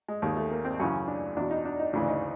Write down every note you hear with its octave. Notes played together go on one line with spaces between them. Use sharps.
G#3
D#2 D#3 G#3
A3
A#3
C4
F#2 C#3 E3 C#4
D4
E2 B2 D4
D#4
D4
D#4
D2 C#3 E3 D4
D#4